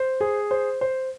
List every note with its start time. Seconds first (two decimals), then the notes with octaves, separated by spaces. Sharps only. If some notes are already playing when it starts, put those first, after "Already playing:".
Already playing: C5
0.21 G#4
0.51 C5
0.81 C5